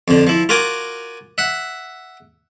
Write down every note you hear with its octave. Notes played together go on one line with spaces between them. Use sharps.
F2 D3
F3 E4
F4 F#4 A#4 G#5 D6
E5 F#5